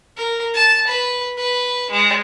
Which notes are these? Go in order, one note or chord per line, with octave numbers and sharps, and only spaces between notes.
A#4
A5
B4
B4
G#3